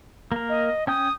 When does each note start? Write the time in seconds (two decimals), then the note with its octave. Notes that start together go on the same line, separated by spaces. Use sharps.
0.32 A#3 A#4
0.49 D#5
0.87 C#4 G5 D#6 G6